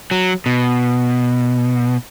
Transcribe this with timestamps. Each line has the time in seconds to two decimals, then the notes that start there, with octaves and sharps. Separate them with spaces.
0.11 F#3
0.46 B2